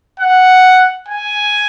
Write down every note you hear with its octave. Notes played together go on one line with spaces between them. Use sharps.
F#5
G#5